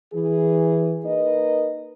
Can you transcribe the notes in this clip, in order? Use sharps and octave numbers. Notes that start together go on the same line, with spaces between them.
E3 G#4
A#3 D#4 A#4 B4 D#5